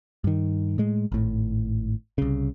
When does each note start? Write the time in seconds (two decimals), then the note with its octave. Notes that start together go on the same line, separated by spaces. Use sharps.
0.24 G2 D#3
0.78 A2 G#3
1.12 G#1 A2
2.18 C2 C#3